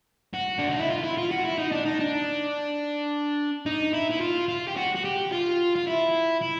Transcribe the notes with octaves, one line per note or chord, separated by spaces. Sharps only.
F#4
D4
D#4
E4
F4
E4
F4
F#4
E4
D#4
D4
D#4
D4
D#4
E4
E4
F4
F4
G4
F#4
F#4
G4
F4
F4
E4
E4